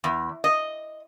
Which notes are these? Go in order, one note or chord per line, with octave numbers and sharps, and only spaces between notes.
E2
D#5